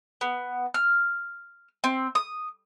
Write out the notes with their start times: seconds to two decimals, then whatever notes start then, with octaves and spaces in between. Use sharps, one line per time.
0.21 B3
0.74 F6
1.84 C4
2.15 D#6